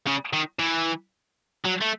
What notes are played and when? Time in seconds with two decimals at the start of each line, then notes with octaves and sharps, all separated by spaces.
0.07 C#3
0.33 D#3
0.59 E3
1.65 F#3
1.81 A3